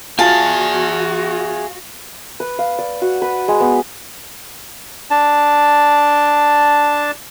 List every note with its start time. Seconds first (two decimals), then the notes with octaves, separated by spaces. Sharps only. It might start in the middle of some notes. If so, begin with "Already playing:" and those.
0.19 F4 F#4 G#4 E5 G#5 A5
2.40 B4
2.59 F5
2.79 D5
3.02 F#4
3.22 B4
3.48 G#3
3.60 B3
5.11 D4 A5